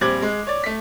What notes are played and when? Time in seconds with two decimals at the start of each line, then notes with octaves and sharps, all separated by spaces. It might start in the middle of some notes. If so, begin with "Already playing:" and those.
0.01 A#1 G3 C4 D6 G#6 F#7
0.22 G#3
0.47 C#5 D5
0.64 A3 B6